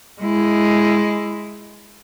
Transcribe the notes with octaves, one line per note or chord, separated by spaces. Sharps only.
G#3 E4